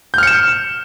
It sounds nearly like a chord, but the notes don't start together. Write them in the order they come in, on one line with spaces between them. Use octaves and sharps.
G6 F6 C#7 E7